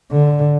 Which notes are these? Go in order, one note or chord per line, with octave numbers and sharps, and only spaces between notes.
D3